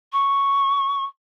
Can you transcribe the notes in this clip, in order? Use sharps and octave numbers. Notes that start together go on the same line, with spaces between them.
C#6